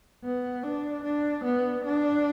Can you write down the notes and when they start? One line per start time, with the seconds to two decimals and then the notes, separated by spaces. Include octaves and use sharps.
0.24 B3
0.64 D4
1.04 D4
1.44 B3
1.84 D4